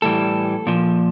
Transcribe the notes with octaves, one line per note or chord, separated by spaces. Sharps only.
A2 E3 G3 A4
A#2 F3